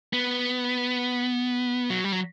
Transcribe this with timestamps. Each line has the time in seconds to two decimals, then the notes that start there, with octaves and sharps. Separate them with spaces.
0.13 B3
1.90 F#3
2.04 G3
2.12 F#3